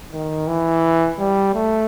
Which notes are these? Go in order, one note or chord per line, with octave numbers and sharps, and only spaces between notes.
D#3
E3
G3
A3